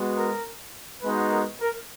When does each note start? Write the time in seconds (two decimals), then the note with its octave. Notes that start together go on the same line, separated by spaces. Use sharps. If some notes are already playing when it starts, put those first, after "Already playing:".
Already playing: G#3 B3 F#4
0.18 A#4
1.03 G#3 B3 D#4 F#4 B4
1.32 A#4
1.60 A#4